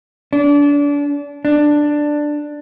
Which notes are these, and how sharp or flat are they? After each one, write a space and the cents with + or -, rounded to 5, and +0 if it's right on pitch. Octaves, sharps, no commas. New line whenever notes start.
D4 -30
D4 +10